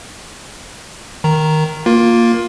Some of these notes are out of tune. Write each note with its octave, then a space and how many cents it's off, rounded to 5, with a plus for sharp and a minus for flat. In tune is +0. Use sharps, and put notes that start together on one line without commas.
D#3 +0 A#5 +0
A#3 +0 F4 +15 A#4 +20